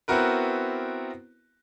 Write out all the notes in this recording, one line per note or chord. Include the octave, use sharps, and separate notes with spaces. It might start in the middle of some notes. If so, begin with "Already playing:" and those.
B3 C4 E4 F#4 A#4 B4